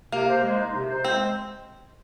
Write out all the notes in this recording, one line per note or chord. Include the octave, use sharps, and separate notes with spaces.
C3 A#3
C5
G#3
D#4
C3
C5
G#3 C4